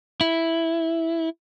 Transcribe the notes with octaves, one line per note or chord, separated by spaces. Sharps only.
E4